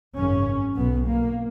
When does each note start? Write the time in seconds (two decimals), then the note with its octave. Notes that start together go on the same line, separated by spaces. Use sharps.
0.16 G#1 F#2 C#3 C#4
0.75 B1 B2 B3
1.06 A#3